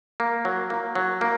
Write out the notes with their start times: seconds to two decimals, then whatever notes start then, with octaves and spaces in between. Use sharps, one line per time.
0.20 A#3
0.45 F#3
0.70 A#3
0.95 F#3
1.21 A#3